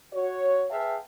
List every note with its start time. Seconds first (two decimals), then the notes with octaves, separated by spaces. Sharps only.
0.13 F#4 C#5
0.71 G#4 B4 E5 F5 G5 A5